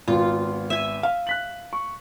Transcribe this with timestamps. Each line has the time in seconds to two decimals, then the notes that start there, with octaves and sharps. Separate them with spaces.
0.08 G#1 B3 F4
0.70 E5 G#5
1.03 F5
1.27 F#6 B6 F#7
1.73 C#6